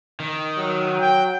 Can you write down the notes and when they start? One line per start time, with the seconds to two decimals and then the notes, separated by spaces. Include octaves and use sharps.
0.20 D#3
0.58 F#3
1.00 G5